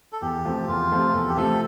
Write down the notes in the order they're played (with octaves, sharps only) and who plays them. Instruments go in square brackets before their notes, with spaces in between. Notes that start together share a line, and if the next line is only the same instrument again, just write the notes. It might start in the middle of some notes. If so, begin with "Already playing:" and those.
[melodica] A4
[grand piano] E2 [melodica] G4
[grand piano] C3 F3 A3
[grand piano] E2 [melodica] F4
[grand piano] C3 F3 A3
[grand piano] E2 [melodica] A4
[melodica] G4
[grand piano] C3 F3 A3 [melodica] A4